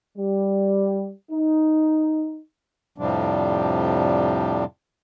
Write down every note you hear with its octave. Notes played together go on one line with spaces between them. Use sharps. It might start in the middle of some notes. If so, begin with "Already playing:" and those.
G3
D#4
F2 A2 C3 F3 G3 D4